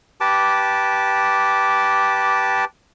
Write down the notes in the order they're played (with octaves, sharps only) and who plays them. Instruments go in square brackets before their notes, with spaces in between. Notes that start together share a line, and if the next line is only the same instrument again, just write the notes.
[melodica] G4 B4 A5 D6